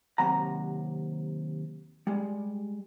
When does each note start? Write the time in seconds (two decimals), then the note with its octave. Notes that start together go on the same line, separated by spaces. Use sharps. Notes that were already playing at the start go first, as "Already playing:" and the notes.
0.18 D#2 C3 F#3 F#5 A#5
2.07 G3 G#3